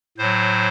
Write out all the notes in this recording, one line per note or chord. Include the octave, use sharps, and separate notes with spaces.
A2 F#3 C5